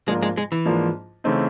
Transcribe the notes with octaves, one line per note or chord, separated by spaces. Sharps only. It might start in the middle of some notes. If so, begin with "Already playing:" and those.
G#2 F3 G#3 A#3 D4 F4
G#3
G#3
E3
G#2 F3 A#3 D4 F4
C#3 E3 A3 C4 D#4